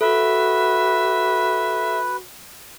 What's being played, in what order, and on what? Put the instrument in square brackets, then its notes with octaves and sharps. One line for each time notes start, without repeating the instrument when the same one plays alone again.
[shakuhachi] F#4 [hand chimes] A4 [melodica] B4 [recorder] E5